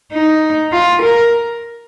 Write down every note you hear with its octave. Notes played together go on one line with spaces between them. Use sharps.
D#4
F4
A#4